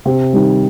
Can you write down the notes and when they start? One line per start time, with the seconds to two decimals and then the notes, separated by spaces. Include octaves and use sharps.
0.06 C3
0.33 D#3 G3